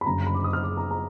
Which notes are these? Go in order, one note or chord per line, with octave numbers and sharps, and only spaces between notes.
B5
F#1 F#2 D3 A#5
B5
D6
D#6
F6
D6
A#5
A#5